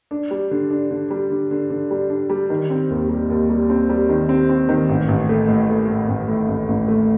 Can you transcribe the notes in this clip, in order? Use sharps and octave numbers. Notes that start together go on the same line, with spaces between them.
D4
G3
D3
D4
D3
G3
D3
D3
D3
G3
D4
G3
D#3
C4
D#2
G3
D#2
G3
C4
G3
D#3
C4
C4
D#3
A1
A1
A3
A2
A3
A2
A1
A2
A1
A1
A3